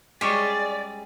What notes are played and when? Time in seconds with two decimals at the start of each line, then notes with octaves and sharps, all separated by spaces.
0.21 G3 G#3 C#4 G#4 D5 C#6 D6 B6